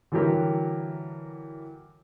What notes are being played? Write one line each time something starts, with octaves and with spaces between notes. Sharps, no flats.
D3 E3 F#3 G3 G4 A#4